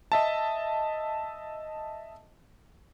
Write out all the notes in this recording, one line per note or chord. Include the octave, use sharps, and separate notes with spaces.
D#5 E5 A5